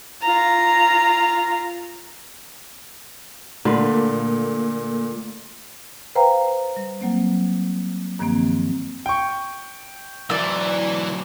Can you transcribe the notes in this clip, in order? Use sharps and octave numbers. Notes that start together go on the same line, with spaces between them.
F4 A#5
A#2 D3 A3 A#3 B4
B4 C5 F5 G5 A#5
G3
F#3 A#3 C4
G2 D#3 F3 A#3 C4
G5 C#6
E3 F#3 E4 D5 C6 E6